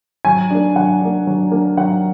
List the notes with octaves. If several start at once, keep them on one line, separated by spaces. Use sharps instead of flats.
F#3 G#5
A#3 D4
F#3 F#5
A#3 D4
F#3
A#3 D4
F#3 F#5